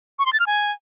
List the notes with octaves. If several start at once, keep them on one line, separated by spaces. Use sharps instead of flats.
C#6
C6
A6
F6
G#5